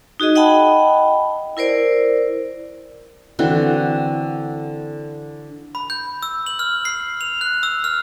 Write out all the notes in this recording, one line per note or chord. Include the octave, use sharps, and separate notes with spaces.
D#4 F#4 G#4 D#5
D#5 F#5 G5 A5 B5
E4 A#4 C5 D5
D3 E3 C4 F#4
B5
G6
E6
F#7
F6
C7
F7
F#6
E6
F6